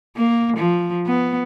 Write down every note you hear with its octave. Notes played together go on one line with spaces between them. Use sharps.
A#3
F3
B3